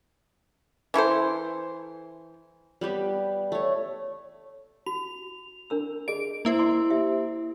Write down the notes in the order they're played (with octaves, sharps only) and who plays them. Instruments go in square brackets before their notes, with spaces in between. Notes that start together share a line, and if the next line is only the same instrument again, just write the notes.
[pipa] E3 E4 A4 C5
[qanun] G3 B3 G4 B4
A3 C#5
[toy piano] F#4 [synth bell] F7
[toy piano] D4 A#4 E6
[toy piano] G#4 D#5 [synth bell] D7
[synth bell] A#3 E4 C5
[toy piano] D#5 C6 D6
G4 E5